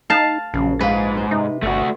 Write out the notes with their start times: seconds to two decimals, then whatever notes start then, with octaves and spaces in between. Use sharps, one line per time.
0.10 D#4 F5 A5
0.54 A#1 C#3 F#3
0.81 G#2 B4 C5 F5
1.17 C5
1.31 C3 D#4
1.62 G1 A3 F#4